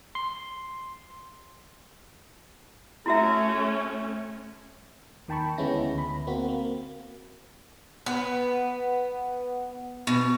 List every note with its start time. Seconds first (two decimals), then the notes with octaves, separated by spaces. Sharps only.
0.15 C6
3.06 A3 C#4 E4 F#4 E5
5.28 D#2 D#3 G5 A5 B5 C#6
5.58 D2 G#3 B3 C#4 E4 A#6
5.95 D2 B5
6.27 A#3 C4 F#4
6.48 A#3
8.06 B3
10.07 B2